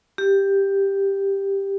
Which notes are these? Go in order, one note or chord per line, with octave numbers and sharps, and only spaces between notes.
G4